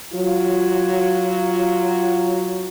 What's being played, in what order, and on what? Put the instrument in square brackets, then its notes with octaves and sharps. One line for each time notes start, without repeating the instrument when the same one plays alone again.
[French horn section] F#3 F4